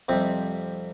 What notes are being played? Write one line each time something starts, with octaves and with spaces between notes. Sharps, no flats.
F2 C3 G3 C4